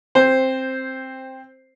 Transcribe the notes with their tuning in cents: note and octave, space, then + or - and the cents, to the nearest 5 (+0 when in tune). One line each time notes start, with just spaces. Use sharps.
C4 +10 C5 +0